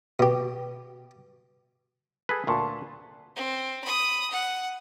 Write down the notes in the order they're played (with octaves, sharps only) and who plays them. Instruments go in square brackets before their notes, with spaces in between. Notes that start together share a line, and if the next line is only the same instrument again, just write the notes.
[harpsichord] B2 G4
[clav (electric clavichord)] G#4 A4 B4
[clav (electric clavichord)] D2 A#2 [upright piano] A5 C6 C#6
[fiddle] C4
B5 D#6
F#5